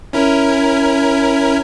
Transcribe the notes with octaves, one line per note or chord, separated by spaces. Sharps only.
C#4 E4 A#4